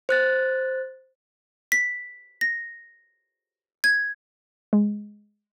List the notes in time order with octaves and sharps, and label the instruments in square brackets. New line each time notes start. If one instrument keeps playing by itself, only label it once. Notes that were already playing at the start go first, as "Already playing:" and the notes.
[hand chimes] C5 F#6 A6
[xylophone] B6
A#6
G#6
[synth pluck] G#3